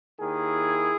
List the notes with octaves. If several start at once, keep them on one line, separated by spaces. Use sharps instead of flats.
D#2 D#3 E4 G#4